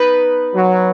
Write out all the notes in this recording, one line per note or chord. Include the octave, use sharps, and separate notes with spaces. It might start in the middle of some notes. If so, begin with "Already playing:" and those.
Already playing: B3 D#4 B4
F#3